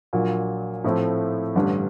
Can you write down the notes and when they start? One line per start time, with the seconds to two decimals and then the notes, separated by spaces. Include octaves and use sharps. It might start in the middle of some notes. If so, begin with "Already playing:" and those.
0.13 A#1 A#2 F#3
0.84 A2 F3 A3 C4 E4
1.55 A1 G2 D3 G3